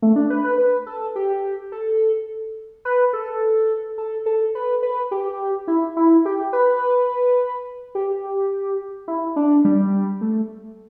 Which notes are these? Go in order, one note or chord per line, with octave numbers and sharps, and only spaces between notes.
A3
D4
B4
B4
B4
A4
G4
A4
B4
A4
A4
A4
B4
B4
G4
E4
E4
G4
B4
G4
E4
D4
G3
A3